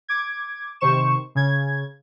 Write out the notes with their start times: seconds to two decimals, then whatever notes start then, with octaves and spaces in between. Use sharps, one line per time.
0.08 D6 G#6
0.81 C3 D#3 C5 C#6 E7
1.35 C#3 G#6